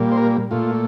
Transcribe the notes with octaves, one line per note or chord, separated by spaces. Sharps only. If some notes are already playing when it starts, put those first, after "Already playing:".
Already playing: A#2 G3 A#3
C5
A#4
A#2 A3 F4